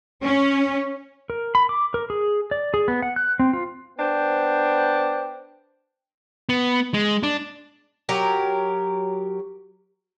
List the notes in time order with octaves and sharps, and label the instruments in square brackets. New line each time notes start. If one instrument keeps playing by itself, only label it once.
[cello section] C#4
[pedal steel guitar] A#4
B5
D6
A#4
G#4
D5
G#4
B3
F#5
F#6
C4
F4
[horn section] B3 D4 C5 G5
[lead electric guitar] B3
G#3
D4
[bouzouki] F#3 G4 A#4